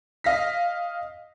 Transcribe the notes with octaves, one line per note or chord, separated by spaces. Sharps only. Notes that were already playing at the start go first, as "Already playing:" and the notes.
D#5 F5 A#6 B6